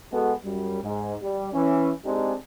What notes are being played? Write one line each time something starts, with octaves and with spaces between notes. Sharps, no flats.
G#3 B3 F#4 G#4 A4
F#2 G3
G#2
G3
E3 C#4
G#3 C4 D4 D#4 G4 G#4